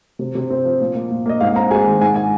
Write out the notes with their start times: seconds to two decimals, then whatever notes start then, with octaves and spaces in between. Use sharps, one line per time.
0.19 C3
0.35 C3
0.50 C4
0.65 F3
0.80 A#2
0.95 A#3
1.10 A#2
1.26 A#3 D#5
1.41 G#2 F5
1.55 C4 A#5
1.71 G#3 G#5
1.86 D#3
2.01 G#2 G#5
2.16 G#5